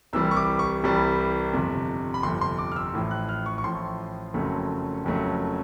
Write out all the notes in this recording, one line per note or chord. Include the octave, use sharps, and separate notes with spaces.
C2 C3 E3 G3 E6
C#6
D6
C#6
C2 C3 E3 G3
G1 F2 C3
B5
G1 F2 C3 C6
C6
D6
F6
E6
A1 A2 F3
F#6
F6
C#6
C#6
A1 A2 F3 C6
F#1 F2 C#3 F#3 A3
F#1 F2 C#3 F#3 A3